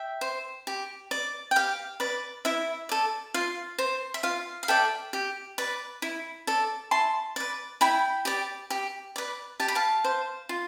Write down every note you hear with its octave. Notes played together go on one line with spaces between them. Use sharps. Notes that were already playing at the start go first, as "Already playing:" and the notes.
Already playing: E5 G5
C5
G4
D5
G5
G4 F5
B4 D5
E4 E5
A4 D5
F4 F5
C5
E5
F4 F5
F5
A4 D5 E5 G5
G4
B4 D5
E4
A4 D5
E4 A5 C6
B4 D5
E4 G5 B5
G4 D5
G4
B4 D5
G4 A5
B5
F5 A5
C5
F4